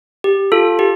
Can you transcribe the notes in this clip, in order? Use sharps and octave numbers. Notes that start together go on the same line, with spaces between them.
G4
F4 A4
G4